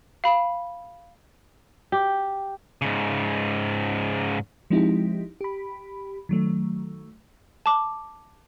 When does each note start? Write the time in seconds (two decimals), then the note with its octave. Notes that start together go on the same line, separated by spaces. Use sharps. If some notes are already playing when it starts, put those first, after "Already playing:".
0.24 F5 B5
1.92 G4
2.82 G#2 C#3
4.70 F3 G#3 C4 D#4 E4 G4
5.41 G4 B5
6.29 D#3 F#3 A3
7.66 A5 D6